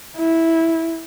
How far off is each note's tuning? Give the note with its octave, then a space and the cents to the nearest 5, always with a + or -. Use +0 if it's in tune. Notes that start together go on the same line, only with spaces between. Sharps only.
E4 -5